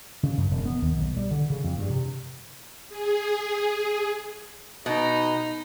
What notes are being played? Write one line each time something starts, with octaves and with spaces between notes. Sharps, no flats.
C#3
F#2
E1
B3
D#2
B1
G3
D3
C#3
F2
G2
C3
G#4
B2 D#4